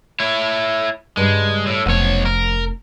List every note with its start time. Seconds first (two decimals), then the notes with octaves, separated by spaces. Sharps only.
0.20 E4 C#5
1.17 G2 C#3 G3 G#3
1.66 A2
1.86 F1 B1 F3 C#5 F#5
2.25 A#4